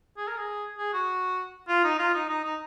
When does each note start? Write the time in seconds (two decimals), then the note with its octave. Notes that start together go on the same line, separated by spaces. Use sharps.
0.17 G#4
0.27 A#4
0.37 G#4
0.78 G#4
0.93 F#4
1.68 F4
1.84 D#4
1.99 F4
2.14 D#4
2.29 D#4
2.44 D#4